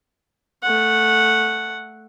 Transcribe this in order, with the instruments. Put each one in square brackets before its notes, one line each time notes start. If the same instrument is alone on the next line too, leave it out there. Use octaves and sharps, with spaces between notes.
[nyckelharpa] A3 F#5